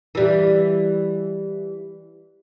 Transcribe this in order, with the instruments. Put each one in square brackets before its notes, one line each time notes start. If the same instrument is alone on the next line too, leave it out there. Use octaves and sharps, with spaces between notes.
[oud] E3 G3